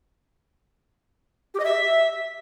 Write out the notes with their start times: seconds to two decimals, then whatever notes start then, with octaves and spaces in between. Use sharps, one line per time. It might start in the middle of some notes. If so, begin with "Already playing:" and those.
1.54 G4
1.59 D#5
1.65 E5